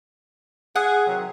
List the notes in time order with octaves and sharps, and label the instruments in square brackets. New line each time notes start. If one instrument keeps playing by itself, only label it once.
[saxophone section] G#4 [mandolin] F#5
[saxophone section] C3 D#3 F#3